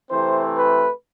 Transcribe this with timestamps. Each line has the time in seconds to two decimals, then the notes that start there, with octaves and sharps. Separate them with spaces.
0.10 C3 E3 A3 C4 C5
0.58 B4